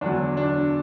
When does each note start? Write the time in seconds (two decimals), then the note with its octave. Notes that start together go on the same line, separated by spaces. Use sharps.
0.01 E2 D3 F#3 D4
0.37 D4